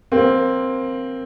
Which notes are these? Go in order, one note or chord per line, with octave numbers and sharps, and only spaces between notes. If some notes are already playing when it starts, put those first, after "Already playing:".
A#3 C4